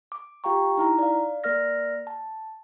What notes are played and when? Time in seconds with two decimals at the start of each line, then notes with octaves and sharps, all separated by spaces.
0.12 D6
0.44 F4 G4 F5 G5 A#5 C#6
0.77 D#4 E4 A#5
0.99 D5 F5
1.44 A#3 A#4 D5 F6 A#6
2.07 A5